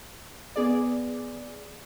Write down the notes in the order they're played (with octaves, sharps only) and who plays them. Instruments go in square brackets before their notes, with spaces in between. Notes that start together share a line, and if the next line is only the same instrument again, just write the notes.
[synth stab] B3 G#4 D5